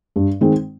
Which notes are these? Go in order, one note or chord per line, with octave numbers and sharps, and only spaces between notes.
G2
D#3 G#3 C4